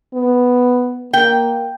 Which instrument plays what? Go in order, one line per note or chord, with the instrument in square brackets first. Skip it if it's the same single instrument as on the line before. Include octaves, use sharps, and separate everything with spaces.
[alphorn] B3
[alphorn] A#3 [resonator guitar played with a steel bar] G5